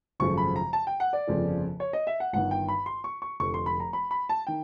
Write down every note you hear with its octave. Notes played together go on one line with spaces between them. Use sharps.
G#1 F#2 C#3 F3 A3 C#6
B5
A#5
A5
G5
F#5
D5
G1 F2 C#3 F3 A3
C#5
D#5
E5
F#5
G1 G2 D#3 F#5
G5
B5
C6
C#6
C#6
F1 F2 D3 C#6
C6
B5
A#5
B5
B5
A5
D#3 G5